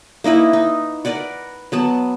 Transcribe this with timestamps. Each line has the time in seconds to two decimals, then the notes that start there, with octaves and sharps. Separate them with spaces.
0.24 A#3 D#4 E4 B4
0.53 D#4
1.05 A#4 B4 D5 F#5
1.72 F#3 B3 A5